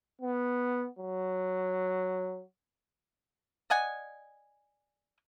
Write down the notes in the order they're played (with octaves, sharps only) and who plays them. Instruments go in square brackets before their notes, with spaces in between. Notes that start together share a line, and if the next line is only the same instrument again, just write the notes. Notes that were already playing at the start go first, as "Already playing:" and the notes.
[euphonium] B3
F#3
[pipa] D5 D#5 F#5 G#5